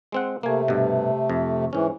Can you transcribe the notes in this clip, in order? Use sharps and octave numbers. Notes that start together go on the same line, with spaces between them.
G#3 C4 F#5
C3 A3 A#3 G#5
G2 B2
F2
G#2 E3 C#4